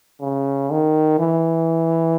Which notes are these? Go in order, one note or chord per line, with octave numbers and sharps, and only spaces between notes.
C#3
D#3
E3